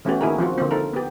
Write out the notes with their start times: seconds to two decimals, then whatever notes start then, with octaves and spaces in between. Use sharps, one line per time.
0.05 E3 A3 B3 C#4 F#4 G4
0.21 D#3 A#3 E4 F#4 G#4 A#4
0.38 F3 C4 F4 F#4
0.58 D3 A#3 C4
0.71 D#4 A4 A#4
0.93 B3 G4